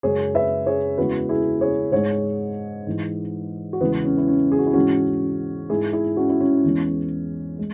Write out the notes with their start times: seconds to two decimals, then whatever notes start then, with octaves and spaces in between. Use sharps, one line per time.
0.03 F#2 C#3 G#3 G#4 C#5
0.35 B4 E5
0.66 G#4 C#5
0.98 E2 C#3 E3 G#3 F#4 B4
1.29 E4 G#4
1.61 G#4 C#5
1.92 G#2 G#3 G#4 C#5
2.87 G#2 E3 G#3
3.73 F#4
3.81 E2 C#3 G#3 B3 E4
4.04 C#4
4.18 E4
4.27 C#4
4.52 G#4
4.59 F#4
4.67 E4
4.73 G#2 E3 G#3 C#4 F#4
5.69 G#2 G#3 E4 G#4
5.93 E4 G#4
6.17 C#4 F#4
6.29 E4
6.40 C#4
6.64 E2 E3 G#3
7.59 G#3